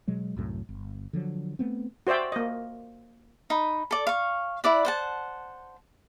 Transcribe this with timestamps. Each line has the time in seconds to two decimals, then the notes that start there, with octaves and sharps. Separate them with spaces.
0.08 B2 F#3 G#3
0.36 C2 F#2 A2
0.69 G1
1.13 D3 F3 F#3
1.59 A3 B3 C4
2.07 F#4 C5 D5 E5 G5
2.32 A#3 D#5
3.50 D#4 B5
3.91 A4 D5
4.07 F5 C#6
4.64 E4 D5 F#5
4.85 C5 F#5 A5